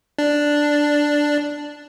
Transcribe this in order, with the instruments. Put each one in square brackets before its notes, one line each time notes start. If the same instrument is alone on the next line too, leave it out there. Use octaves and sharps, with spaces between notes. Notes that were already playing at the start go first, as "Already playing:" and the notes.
[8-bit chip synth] D4